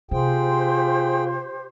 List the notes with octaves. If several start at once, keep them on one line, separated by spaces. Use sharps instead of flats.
C3 F4 G4 G#4 C5 G5